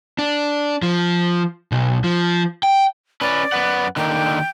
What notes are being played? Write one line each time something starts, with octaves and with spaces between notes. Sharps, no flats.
D4
F3
B1
F3
G5
C#4 B4 D5
F#2 B4 F#5
D3 D#3 A#3 G5